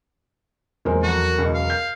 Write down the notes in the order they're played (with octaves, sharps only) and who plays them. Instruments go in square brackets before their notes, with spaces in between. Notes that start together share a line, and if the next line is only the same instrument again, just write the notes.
[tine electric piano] E2 F#3 [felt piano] A#2 G#3 C4 [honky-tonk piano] A#4
[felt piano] F2 [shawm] F#4
[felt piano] C#2 B2
[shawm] F5
[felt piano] G6